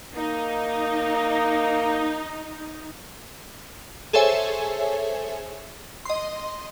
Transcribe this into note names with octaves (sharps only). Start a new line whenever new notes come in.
A#3 D#4
G#4 A4 C5 C#5 E5 G#5
D#5 C6